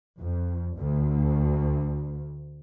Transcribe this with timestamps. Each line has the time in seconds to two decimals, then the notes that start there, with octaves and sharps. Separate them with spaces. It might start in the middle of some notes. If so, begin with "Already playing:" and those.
0.21 F2
0.77 D2